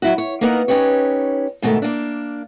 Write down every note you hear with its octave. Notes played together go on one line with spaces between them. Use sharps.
F#3 E4 F#4
C#5
A#3 B3 D#4 A#4 F#5
C#4 D#4 G4 B4 C#5
G#2 B2 D#3 A3
A#3 D4